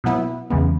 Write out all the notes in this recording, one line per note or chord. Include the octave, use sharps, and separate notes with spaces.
B2 F#3 B3 E4
E2 C#3 E3 G#3 B3